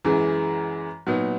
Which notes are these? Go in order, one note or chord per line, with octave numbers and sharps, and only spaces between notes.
F#2 E3 G#3
A#2 F#3 B3 D#4